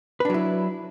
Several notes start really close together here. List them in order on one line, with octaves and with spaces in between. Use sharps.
B4 D4 F#3 E4